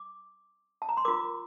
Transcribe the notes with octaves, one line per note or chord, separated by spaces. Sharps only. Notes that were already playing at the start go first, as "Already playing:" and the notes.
Already playing: D6
A5
A#5
C6
F4 A#4 D6